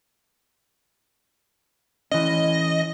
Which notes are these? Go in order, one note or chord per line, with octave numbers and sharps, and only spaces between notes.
E3 C#4 D#5